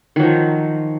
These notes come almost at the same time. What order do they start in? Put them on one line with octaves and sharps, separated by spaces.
D#3 F#3 F3